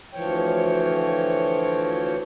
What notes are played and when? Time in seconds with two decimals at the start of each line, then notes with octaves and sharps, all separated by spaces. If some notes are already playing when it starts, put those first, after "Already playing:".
0.14 D2 E3 F3 C#5 G5